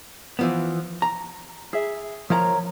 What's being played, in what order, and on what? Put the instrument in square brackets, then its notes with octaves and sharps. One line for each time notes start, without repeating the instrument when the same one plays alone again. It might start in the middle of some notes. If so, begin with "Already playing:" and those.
[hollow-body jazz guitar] E3 F3 B3
A#5
[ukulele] G#4 E5
[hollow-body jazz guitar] F3 [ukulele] A#4 C#5 A#5